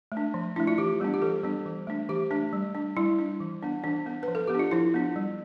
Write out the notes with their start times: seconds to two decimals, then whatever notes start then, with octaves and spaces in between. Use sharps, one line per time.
0.12 A3
0.17 D4
0.34 F3
0.56 A3 D4 E4
0.67 F4
0.78 E3 G4
1.00 G3 B3 D4
1.14 G4
1.22 E3 A4
1.43 G3 B3 D4
1.66 E3
1.87 A3 D4
2.09 E3 G4
2.31 A3 D4
2.53 G3
2.75 D4
2.97 G3 E4
3.19 D4
3.40 E3
3.62 B3 D4
3.84 E3 D4
4.06 B3 D4
4.23 F3 B4
4.35 A4
4.47 B3 G4
4.55 D4 F4
4.71 F3 E4
4.94 B3 D4
5.16 G3